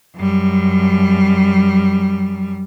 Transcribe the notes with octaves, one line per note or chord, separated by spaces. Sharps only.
F#2 G3